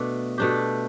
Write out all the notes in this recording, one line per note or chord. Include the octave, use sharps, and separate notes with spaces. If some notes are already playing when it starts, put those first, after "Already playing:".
Already playing: B2 A3 D4
B2 A3 D4 G4